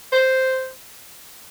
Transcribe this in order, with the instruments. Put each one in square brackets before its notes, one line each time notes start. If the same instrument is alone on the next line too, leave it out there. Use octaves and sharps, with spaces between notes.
[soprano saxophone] C5